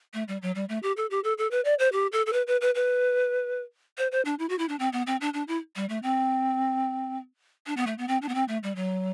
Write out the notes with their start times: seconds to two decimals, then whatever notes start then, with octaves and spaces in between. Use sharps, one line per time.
0.14 A3
0.28 G3
0.42 F#3
0.55 G3
0.69 A3
0.83 G4
0.97 A4
1.10 G4
1.24 A4
1.38 A4
1.51 B4
1.65 D5
1.79 C5
1.92 G4
2.12 A4
2.26 A4
2.33 B4
2.47 B4
2.61 B4
2.75 B4
3.98 C5
4.12 C5
4.25 D4
4.39 E4
4.49 F#4
4.58 E4
4.69 D4
4.79 C4
4.93 B3
5.07 C4
5.21 D4
5.34 D4
5.48 E4
5.76 G3
5.89 A3
6.03 C4
7.66 D4
7.77 B3
7.87 A3
7.98 B3
8.08 C4
8.22 D4
8.29 B3
8.35 C4
8.48 A3
8.63 G3
8.76 F#3